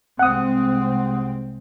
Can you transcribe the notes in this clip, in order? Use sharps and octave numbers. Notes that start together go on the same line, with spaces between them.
C2 G#3 C4 F#5 D#6